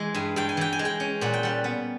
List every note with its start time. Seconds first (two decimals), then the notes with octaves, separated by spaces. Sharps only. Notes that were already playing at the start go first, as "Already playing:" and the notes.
Already playing: E3 G#3
0.14 G2 G#5
0.36 G2 G5
0.49 G#5
0.57 E3 G5
0.73 G#5
0.79 G#3
0.85 G5
1.00 C#4
1.21 A#2 F#5
1.33 G5
1.43 G3 F#5
1.64 B3